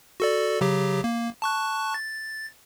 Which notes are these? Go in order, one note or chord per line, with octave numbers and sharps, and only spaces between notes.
F#4 A4 D5
C#3 F#3 G4
A#3
A5 C#6 F#6
A6